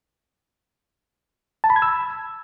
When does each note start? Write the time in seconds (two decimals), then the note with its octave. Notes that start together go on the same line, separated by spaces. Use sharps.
1.64 A5
1.70 B5
1.76 G#6
1.82 E6